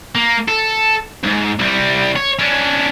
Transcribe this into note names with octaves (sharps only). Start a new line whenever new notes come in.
A#3
A4
F2 G#2
C2 G3
C#5
C#4 D4